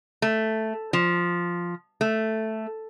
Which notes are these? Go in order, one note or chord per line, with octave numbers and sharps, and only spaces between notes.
A3
F3
A3